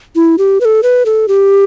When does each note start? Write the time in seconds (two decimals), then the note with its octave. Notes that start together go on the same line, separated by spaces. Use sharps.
0.16 E4
0.38 G4
0.61 B4
0.65 A4
0.83 B4
1.06 A4
1.28 G4